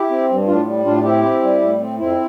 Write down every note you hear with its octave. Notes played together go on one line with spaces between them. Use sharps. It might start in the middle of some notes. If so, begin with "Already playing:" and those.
Already playing: E4 G4
C4
G2
A2 D4 F4
G3
A2 D4 F4
C4 E4 G4
C4
G3
A2
C4
F2 C4 E4